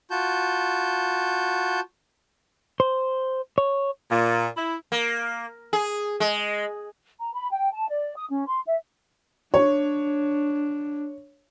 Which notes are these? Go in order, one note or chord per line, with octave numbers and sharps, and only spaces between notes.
F4 F#4 A5 G6
C5
C#5
A#2
E4
A#3
G#4
G#3
A#5
B5
G5
A5
D5
D#6
C#4
C6
E5
D4 C#5